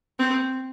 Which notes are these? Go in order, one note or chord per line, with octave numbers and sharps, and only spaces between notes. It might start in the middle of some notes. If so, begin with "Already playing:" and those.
C4